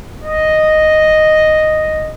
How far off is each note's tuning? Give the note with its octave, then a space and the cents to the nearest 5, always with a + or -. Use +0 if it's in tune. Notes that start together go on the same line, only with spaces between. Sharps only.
D#5 -5